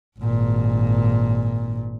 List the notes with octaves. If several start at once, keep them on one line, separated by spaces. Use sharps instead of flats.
G#1 A#2